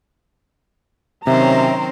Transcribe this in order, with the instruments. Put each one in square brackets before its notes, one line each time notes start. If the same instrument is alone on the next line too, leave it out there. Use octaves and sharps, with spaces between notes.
[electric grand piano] C3 [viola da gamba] D#3 F#3 C5 [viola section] C4 C#4 A#5 [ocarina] E5